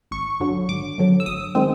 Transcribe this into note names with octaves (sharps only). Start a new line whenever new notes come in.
G#1 C#6
F#2 D3 F#3
G#1 D6
F#2 D3 F#3
E6
G#1 D#6
D#3 G#3 C4